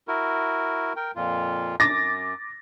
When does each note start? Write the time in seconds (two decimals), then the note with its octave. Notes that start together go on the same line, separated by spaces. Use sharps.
0.08 E4 F#4 A#4
0.96 A#4 G5
1.15 F2 A#2 F4
1.80 F#2 D6 A6 A#6